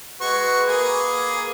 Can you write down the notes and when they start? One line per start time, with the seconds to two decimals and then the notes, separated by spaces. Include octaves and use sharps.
0.21 G#3 F#4 B4 C#6
0.68 A#3 G#4 G#5